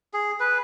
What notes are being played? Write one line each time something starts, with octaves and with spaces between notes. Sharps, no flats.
G#4
B4